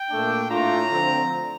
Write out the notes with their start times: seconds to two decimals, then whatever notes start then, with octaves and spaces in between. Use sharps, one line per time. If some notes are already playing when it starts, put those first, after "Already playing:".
Already playing: G5
0.11 A#2 A3 D4
0.49 A2 A3 D4 F4 A#5
0.89 D3 F3 C4